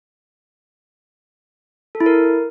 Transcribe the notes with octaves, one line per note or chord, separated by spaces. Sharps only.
A4
E4
A#4